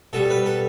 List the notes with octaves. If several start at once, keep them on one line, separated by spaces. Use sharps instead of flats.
B2 G3 A4
B4
A4